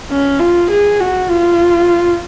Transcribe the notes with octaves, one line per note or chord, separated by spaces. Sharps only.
C#4
F4
G#4
F#4
F4